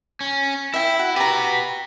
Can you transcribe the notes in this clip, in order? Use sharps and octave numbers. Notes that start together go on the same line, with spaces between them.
C#4
E4 E5 G5
F#4
F#4 G4 B4 A#5